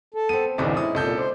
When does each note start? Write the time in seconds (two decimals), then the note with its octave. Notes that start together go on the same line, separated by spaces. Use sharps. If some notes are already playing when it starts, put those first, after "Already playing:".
0.14 A4
0.29 B3 C4 D#7
0.58 D1 C2 D3 E3 D4 D#4 A4
0.77 G#3 C#4 E4 D#6
0.95 C2 A#2 A4 G6
1.17 C5 D5